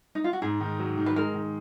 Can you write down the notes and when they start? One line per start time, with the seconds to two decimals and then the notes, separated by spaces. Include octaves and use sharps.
0.15 D#4
0.24 F4
0.33 F#4
0.42 G#2 G#4
0.60 D#3
0.79 F#3
0.97 D#3
1.06 B4
1.16 G#3 A#4
1.34 D#3